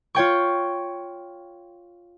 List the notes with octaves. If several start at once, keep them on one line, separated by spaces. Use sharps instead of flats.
F4 C#5 G5 C#6